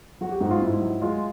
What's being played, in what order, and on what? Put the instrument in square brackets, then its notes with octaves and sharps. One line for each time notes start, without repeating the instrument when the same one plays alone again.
[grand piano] F#3 F#4
G4
G#2 F#4
F4
G#2 E4
F#3
G#3 F4